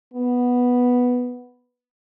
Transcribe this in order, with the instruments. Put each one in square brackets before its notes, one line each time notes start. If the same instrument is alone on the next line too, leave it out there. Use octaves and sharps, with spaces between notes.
[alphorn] B3